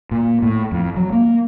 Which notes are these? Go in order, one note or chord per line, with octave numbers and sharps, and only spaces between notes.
A#2
A2
F2
F#3
A#3